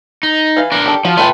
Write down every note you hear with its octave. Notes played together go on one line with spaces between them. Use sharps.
D#4
E3 F5
D4 A#4
G4 A4
F3 F#4
A3 F4 B4 G5 G#5